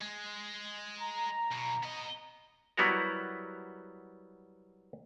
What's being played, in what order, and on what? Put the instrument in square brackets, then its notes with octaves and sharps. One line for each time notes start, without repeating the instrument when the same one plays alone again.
[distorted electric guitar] G#3
[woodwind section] A#5
[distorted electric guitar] B1 B2
B3 D#5
[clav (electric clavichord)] F#3 G3 B3 E4 F#4 A#4